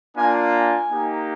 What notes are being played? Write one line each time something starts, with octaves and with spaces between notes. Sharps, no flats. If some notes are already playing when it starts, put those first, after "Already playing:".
A#3 D4 F4 G#5
G#5
A#3 D#4 G4